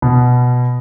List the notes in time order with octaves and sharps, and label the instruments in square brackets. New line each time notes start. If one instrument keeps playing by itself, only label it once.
[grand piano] B2